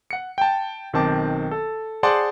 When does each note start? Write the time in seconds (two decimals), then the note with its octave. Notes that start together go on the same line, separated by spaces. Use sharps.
0.11 F#5 C#7
0.38 G5 A5
0.93 B1 D#3 C4 A5 D6
1.51 A4
2.03 G#4 C5 D5 F#5 A5 C6